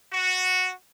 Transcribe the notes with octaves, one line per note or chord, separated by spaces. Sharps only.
F#4